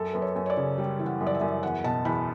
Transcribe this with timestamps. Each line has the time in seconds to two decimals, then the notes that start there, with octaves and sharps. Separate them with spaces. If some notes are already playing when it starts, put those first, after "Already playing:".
Already playing: F#2 A4
0.13 F#2 B4
0.22 C#5
0.36 F#2
0.46 C#5
0.50 D5
0.57 C#3
0.78 G3
1.00 E3
1.06 F#5
1.20 F#2
1.27 D5
1.35 E5
1.41 F#2
1.63 E2 F#5
1.84 B2 A5
2.05 E2 B5